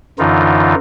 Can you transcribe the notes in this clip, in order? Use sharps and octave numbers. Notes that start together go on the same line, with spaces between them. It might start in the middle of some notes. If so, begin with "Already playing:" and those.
F#2 D3 E3 D#4 F4